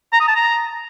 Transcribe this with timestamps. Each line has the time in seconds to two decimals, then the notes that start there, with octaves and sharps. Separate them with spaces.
0.13 A#5
0.20 D#6
0.28 A5
0.36 A#5